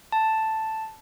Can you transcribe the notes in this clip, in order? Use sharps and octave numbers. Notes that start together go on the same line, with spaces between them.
A5